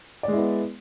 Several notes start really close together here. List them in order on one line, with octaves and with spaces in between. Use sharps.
D5 G#3 E4 B3